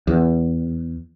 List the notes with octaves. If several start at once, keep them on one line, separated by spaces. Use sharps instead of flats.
E2